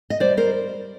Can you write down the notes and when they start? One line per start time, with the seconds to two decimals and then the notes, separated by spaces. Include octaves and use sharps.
0.10 D#5
0.20 G3 C5 D5
0.37 A#4 C5